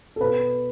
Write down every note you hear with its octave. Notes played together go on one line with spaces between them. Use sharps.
A4
B2 B4